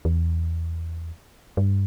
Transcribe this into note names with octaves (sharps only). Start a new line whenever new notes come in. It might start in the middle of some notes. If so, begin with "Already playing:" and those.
E2
G2